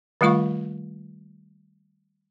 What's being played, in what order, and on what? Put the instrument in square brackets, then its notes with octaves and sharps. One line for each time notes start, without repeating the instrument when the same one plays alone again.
[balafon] D#3 G3 A3 F4 F5 C#6